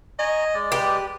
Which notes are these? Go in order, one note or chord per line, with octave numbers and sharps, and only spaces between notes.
D#5 G#5 A#5 C#6
G#3 D5
G4 B4